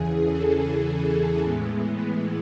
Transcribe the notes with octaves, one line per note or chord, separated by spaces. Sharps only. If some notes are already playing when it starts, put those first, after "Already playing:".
Already playing: E2 C#3 E3 G#4
A4
A2 E3 G#3 B3